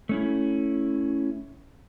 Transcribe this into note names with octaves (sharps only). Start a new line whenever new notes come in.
A3 C#4 E4